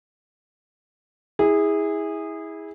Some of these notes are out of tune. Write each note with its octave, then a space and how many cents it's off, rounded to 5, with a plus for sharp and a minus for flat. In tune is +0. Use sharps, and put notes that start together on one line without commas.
E4 -25 G#4 -20